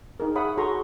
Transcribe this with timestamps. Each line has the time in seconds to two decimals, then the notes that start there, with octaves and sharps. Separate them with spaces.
0.20 D#4 G#4 A#4
0.35 G#4 C#5 E5 F#5 B5 D#6
0.57 F#4 G#4 A4 A#5 C6 C#6